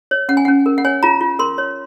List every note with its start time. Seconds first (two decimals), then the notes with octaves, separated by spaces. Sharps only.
0.11 C#5
0.29 C#4 F#5
0.37 G#5
0.45 F#5
0.48 C#4
0.66 A#4
0.78 F#5
0.85 C#5 G#5
1.03 F4 A#5
1.21 F4
1.39 A#4 C6
1.58 C#5